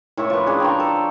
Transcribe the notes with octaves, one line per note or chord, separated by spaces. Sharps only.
A2 C#5 E5 C#6
F3 B4
D4 G#4
G5 A#5 C#6
A4